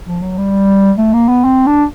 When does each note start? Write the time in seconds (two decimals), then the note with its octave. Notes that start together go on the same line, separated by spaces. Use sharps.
0.07 F3
0.22 F#3
0.38 G3
0.98 A3
1.13 A#3
1.28 B3
1.44 C4
1.67 D4